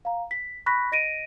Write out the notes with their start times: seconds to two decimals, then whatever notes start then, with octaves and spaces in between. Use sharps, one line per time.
0.05 F5 A#5
0.31 B6
0.66 B5 C#6 F#6 A#6 B6
0.92 D#5 A#6 D7 D#7